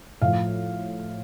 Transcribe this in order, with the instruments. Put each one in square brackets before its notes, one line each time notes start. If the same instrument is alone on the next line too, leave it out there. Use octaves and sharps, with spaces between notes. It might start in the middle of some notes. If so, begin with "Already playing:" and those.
[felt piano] A2 F3 F5